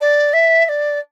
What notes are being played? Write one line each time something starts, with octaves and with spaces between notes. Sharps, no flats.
D5
E5
E5
D5